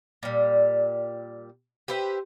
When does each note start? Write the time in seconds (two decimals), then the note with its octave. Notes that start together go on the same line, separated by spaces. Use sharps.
0.23 A#2 G3
1.88 G4 B4 C5 E5